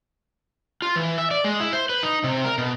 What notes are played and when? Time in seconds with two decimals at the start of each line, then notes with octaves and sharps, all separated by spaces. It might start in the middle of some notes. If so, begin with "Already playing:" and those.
0.82 F4
0.96 E3
1.18 E5
1.31 D5
1.44 G#3
1.60 E4
1.73 C5
1.89 B4
2.03 D#4
2.24 C3
2.45 A#4
2.58 B2